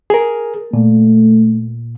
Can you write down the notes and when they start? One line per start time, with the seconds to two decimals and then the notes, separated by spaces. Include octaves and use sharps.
0.10 G#4 A#4
0.73 A#2 A3